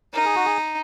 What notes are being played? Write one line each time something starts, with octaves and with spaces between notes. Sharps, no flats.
D#4 A#4
G#4
F#4
G#4